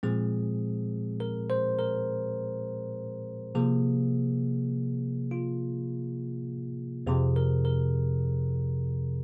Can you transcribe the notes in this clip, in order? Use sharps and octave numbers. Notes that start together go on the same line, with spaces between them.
A#2 F3 G#3 C4 G#4
A#4
C5
A#4
C3 F3 A#3 G#4
F4
F2 C3 F3 G#4
A#4
A#4